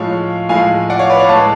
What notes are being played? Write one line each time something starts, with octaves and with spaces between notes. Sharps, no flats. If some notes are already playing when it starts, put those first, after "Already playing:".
Already playing: A2 F3 G#3 C#5 F5
A2 F3 G#3 F5 G#5
D5 F#5
C#5 F5
B4 D5
C#5 F5
A2 G#3 A5